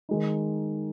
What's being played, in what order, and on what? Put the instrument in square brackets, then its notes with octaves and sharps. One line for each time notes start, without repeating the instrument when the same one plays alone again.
[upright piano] D#3 G#3 D#4